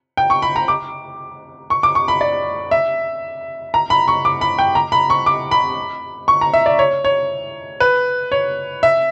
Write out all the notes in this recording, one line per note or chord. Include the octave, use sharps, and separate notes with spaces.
G5
C#6
B5
A#5
D6
C#6
D6
C#6
B5
D5
E5
A#5
B5
C#6
D6
B5
G5
A#5
B5
C#6
D6
B5
C#6
A#5
E5
D5
C#5
C#5
B4
C#5
E5